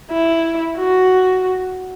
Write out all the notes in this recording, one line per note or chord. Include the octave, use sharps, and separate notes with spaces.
E4
F#4